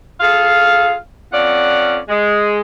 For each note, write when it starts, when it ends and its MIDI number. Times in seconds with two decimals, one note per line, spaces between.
0.20 0.93 65
0.20 0.93 68
0.20 0.93 69
0.20 0.93 77
1.31 1.96 41
1.31 1.96 61
1.31 1.96 65
1.31 1.96 74
1.31 1.96 78
2.09 2.61 56